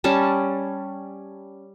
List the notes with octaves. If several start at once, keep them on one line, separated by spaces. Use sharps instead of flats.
G3 C#4 A5